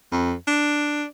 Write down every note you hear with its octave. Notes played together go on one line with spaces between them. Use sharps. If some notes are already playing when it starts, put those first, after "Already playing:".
F2
D4